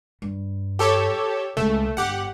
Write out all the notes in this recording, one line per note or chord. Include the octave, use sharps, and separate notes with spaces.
G2
G4 A4 C#5
C#2 A3
G1 G4 F#5